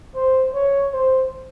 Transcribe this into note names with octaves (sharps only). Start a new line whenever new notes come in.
C5
C#5
C5